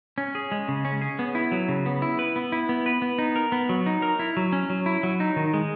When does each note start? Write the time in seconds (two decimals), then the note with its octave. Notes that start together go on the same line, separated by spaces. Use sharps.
0.18 C#4
0.35 G#4
0.52 G#3
0.68 C#3
0.85 C#4
1.02 G#4
1.19 B3
1.35 E4
1.52 F#3
1.68 C#3
1.86 B3
2.02 E4
2.19 B4
2.36 B3
2.52 E4
2.69 B3
2.86 B4
3.02 B3
3.19 D#4
3.36 A#4
3.52 B3
3.69 F#3
3.86 D#4
4.02 A#4
4.19 E4
4.37 F#3
4.53 C#4
4.70 F#3
4.86 E4
5.03 F#3
5.20 D#4
5.36 D#3
5.54 G#3